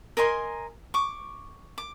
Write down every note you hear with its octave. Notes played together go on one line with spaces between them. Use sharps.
A#4 D#5 G#5 C6
C#6 D6
D6